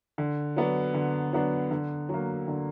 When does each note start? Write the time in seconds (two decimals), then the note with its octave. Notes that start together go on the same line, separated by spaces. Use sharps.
0.18 D3
0.56 F#3 B3 D4
0.94 D3
1.33 F#3 B3 D4
1.71 D3
2.09 F#3 A#3
2.48 D3